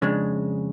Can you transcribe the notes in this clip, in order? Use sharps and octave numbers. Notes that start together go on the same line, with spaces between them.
F2 C#3 G#3 D4